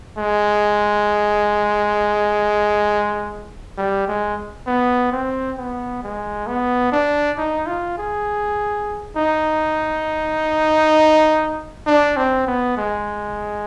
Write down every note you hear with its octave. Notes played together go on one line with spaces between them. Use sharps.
G#3
G3
G#3
B3
C4
B3
G#3
B3
D4
D#4
F4
G#4
D#4
D4
C4
B3
G#3